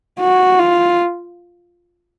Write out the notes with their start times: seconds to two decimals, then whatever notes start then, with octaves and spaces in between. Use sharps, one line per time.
0.20 F#4
0.59 F4